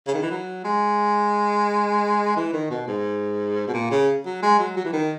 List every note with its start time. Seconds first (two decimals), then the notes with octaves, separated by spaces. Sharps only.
0.07 C#3
0.14 D#3
0.22 E3
0.31 F#3
0.64 G#3
2.36 E3
2.53 D#3
2.70 B2
2.88 G#2
3.67 B2
3.74 A#2
3.91 C#3
4.26 F#3
4.42 G#3
4.59 F#3
4.77 F#3
4.85 E3
4.93 D#3